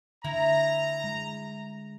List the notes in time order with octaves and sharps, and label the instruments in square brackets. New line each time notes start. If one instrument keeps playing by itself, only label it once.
[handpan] D3 [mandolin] E4 [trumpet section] A#5
[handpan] G#3